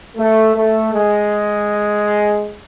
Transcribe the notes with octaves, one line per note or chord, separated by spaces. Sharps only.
A3
A3
G#3